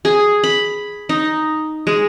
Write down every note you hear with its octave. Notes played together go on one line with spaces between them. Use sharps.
G#4
B5
D#4
G#3